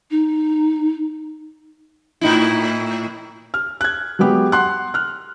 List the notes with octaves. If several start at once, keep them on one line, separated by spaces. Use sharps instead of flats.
D#4
A2 D#4 E4
F6
F#6 G#6
F#3 G#3 B3 G4
F#5 C6 F#6
F6 F#6